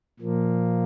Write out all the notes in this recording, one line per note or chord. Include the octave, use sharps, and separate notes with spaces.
A#2 F3 A#3